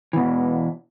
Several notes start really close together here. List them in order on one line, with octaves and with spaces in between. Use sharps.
E3 B2 E2